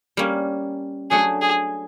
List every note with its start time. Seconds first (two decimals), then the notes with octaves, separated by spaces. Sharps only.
0.17 G3 A#3 C#4
1.11 F#3 A3 D4 G#4
1.41 G#4